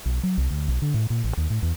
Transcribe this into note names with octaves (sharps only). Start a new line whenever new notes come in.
B1
F#3
C2
D2
B1
D3
A2
A#2
A1
D#2
A2
E2